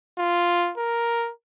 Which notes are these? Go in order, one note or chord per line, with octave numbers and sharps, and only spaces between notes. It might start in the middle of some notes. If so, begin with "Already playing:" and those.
F4
A#4